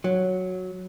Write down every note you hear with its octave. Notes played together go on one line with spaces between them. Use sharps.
F#3